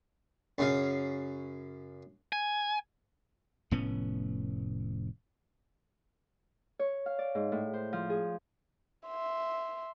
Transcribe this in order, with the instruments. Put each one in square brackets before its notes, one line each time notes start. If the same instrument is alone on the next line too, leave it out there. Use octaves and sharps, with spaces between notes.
[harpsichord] F#2 C#3 F5
[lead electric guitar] G#5
[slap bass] F1 A2 B3 C#4
[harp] C#5
F5
D5
G#2
A2
C5
F3
G#4
[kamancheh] E5 C6